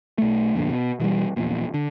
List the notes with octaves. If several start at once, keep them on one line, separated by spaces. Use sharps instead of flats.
B1 A3
G1 F2 A#2 D3
B2
B2 E3 F#3 G3
D#1 A#1 E2 A#2
D3